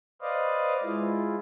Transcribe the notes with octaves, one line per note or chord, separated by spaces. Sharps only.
B4 C5 D5 D#5 F5
G#3 E4 F4